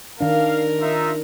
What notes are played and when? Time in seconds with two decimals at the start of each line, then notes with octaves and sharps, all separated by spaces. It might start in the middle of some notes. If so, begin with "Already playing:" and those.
0.21 D#3 D4 A#4 F5
0.81 D#4 F4 E5